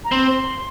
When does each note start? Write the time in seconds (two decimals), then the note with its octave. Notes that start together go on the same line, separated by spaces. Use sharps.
0.05 A#5
0.12 C4 C6